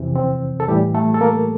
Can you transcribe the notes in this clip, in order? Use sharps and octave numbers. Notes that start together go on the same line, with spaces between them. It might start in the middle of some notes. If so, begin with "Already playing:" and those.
Already playing: F2 C3 E3
C4
A4
A2 E3 G3 G4
A3 A4
A4
A#3 A#4